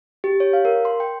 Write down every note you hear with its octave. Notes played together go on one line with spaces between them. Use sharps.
G4
C#5
F5
A#4
C6
G5